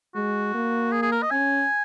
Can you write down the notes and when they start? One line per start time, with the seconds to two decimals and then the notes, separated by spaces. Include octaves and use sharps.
0.15 G#3 F#4
0.54 A#3
0.92 G#4
1.02 G#4
1.12 A#4
1.22 D#5
1.31 C#4 G#5